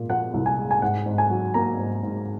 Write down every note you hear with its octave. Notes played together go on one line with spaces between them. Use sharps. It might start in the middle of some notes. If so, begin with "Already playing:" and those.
Already playing: A#2 G#3
F3 F#5
C2
G#5
G#3
G#5
G#2 F#5
G#2
G#5
F#3
A#3 A#5
G#2
G#2